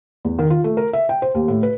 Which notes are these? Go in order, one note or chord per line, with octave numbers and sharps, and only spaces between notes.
E2
D#3
F4
A3
A#4
E5
G5
C5
D#2
A2
B4